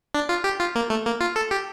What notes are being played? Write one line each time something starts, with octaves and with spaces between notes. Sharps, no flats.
D4
F4
G4
F4
A#3
A3
A#3
F4
A4
G4